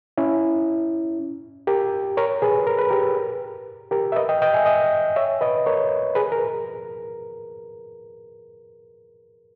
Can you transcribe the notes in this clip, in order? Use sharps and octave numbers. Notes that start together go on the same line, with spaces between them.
C#4 E4
G4 A#4
A#4 C#5
G#4 B4
A#4
B4
G4 A#4
G4 A#4
E5
B4 D#5
D#5 G5
D#5 G5
E5 G#5
D#5 G5
C#5 E5
B4 D#5
A#4 C#5
G#4 B4
A#4